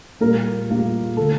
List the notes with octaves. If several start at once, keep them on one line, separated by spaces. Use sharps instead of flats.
A#2 G3 A#3 A#4
A#2 G3 A#3
D3 A3 A4